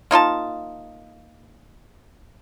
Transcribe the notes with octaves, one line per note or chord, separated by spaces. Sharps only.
A#3 D#4 F4 A5